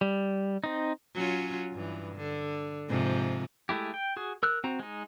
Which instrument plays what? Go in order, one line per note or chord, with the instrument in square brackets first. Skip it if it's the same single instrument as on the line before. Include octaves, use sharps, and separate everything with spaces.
[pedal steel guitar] G3
C4 D#4
[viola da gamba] F#3 C#4 F4
G2 E3
D3
G#2 C3 F3
[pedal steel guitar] G#3 A3 E4 G4
G5
F#4 G#4
A#4 E6 F#6
C4 F#4 A#5
G#3 D#4